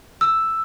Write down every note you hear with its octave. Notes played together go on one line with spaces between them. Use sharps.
E6